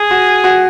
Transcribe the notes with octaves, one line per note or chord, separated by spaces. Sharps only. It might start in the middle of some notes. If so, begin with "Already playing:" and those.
Already playing: G#4
F#4
F#4